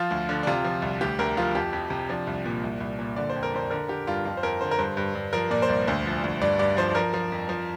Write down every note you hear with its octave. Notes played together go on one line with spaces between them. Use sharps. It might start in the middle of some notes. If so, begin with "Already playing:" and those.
Already playing: F3 F4
D2
D3
D4
C3 F4
F3
C2
D2 G4
D2 A#4
F3 F4
F2 G4
F2
C3
F3 D4
C2
A#2
C2
C2
A#2
D3 D5
C5
F2
A#4
F2 C5
D3 A#4
D3 G4
G2 F4
F2 F4
C5
F2 A#4
D3 C5
A#4
G2 C5
G2
G2
F3 A#4
A#2 D5
C5
C2 D5
D2 C5
F3
D2
G2 D5
G2 D5
F3 C5
F3 A#4
F3
F2
F3